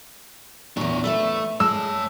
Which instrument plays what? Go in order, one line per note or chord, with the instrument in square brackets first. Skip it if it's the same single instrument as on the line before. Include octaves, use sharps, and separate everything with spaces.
[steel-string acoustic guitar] E2 A#2 [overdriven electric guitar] D4 C#5
[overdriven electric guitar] A3 [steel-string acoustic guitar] B4 D5 E5
[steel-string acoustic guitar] G#3 [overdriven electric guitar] C#5 A5 [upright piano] E6